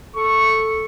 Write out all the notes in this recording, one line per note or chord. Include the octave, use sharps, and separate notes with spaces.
A4 C#6